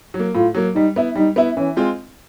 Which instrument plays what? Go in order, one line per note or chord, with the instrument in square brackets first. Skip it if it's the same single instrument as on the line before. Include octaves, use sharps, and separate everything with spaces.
[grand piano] F#3
A#3
[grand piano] A2 [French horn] F4
[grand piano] F#3 A#3
[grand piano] G3 [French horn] D#4
[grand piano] B3 E4
[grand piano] G3 [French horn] D#4
[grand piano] B3 E4
[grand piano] E3 [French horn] C#4
[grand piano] G#3 C4 F4